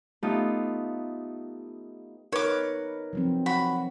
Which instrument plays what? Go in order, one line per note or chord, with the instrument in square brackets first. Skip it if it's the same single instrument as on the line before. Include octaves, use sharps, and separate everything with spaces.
[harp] A3 B3 D#4 F4 G4
[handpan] D#4 A#4 B4 [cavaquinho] C#5 D6
[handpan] F3 F#3 C4
[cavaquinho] F#4 B5